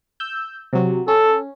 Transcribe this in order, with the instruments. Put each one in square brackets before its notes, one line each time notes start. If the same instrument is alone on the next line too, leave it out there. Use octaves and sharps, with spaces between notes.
[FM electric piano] E6 G6
C3 F#3
[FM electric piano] C#4 [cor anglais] A4